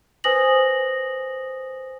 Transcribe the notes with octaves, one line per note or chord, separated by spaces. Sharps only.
B4 C5 G#5 D#6 A#6 F#7